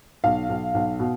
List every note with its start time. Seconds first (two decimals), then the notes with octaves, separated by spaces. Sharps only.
0.24 B1 F5
0.49 B1
0.74 B1
1.00 B2